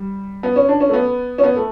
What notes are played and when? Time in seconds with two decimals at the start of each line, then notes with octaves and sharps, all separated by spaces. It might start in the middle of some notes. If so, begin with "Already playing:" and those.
Already playing: G3
0.43 B3
0.56 C#4
0.69 D4
0.80 C#4
0.89 A3
0.93 B3
1.38 C#4
1.43 B3
1.56 A3